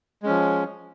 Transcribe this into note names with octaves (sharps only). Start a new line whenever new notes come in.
F3 G#3 C#4